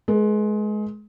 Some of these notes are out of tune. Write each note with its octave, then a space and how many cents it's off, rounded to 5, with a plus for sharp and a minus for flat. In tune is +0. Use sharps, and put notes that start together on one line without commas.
G#3 +25 B4 -45